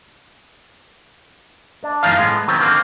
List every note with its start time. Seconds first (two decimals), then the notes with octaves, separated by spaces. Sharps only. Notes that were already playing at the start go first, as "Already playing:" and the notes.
1.84 D4
2.03 F#2 E3 G#3 D#4 F4 F5
2.17 A2 G#3 B3
2.48 D#3 F#3 B3 C4
2.59 D3 D#3 A#3 C4 C5